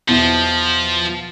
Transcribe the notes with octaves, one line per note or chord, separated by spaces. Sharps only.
E2 B2 E3 F3